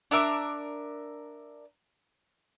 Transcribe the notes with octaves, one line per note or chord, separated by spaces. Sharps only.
D4 A#4 E5 D6